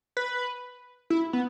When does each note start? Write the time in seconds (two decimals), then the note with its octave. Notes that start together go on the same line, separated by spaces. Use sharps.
0.17 B4
1.10 E4
1.33 B3